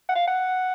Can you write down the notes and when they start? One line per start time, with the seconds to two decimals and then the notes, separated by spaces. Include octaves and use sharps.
0.09 F#5
0.16 F5
0.27 F#5